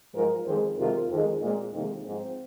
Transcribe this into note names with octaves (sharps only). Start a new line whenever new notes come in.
G#2 F3 G#3 F4 A#4
F2 D#3 G#3 G#4 C5
F2 C3 D#3 G#3 F4 A#4
F2 D#3 G#3
A#2 G#3 C4 F4
F2 C3 D#3 G#3 A#3 D#4
G#2 F3 G#3 C4